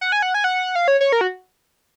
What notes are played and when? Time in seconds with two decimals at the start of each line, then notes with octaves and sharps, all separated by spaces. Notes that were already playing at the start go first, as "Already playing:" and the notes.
0.01 F#5
0.12 G#5
0.22 F#5
0.34 G#5
0.44 F#5
0.75 F5
0.88 C#5
1.01 C#5
1.12 A#4
1.21 F#4